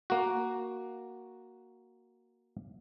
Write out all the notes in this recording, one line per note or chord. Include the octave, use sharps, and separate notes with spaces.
A#3 F#4